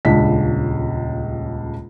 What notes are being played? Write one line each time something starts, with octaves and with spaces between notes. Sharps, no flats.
D#1 C#2 C#3 D4 B6